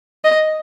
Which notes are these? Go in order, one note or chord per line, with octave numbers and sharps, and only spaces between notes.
D#5